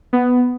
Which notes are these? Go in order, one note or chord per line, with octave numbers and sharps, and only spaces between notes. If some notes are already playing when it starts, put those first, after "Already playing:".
B3